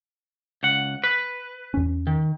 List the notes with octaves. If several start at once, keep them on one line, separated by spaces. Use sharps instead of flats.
C#2 F#5
B4
E2 C#4
D#3